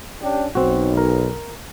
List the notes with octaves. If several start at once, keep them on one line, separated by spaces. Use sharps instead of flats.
C#4 D4 G4
B1 C4 F#4
A#4